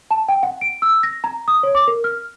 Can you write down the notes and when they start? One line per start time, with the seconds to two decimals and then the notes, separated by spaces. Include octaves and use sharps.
0.11 A5
0.28 G5
0.43 F#5
0.61 D7
0.82 E6
1.03 A#6
1.24 A#5
1.48 D#6
1.63 C#5
1.75 D6
1.87 A#4
2.04 F6